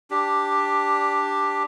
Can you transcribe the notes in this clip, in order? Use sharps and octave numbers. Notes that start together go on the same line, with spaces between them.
D4 G4